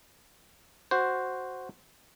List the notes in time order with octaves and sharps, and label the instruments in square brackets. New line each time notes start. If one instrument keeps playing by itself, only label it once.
[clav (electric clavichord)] F#4 C5